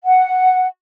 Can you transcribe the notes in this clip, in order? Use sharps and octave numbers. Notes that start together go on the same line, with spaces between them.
F#5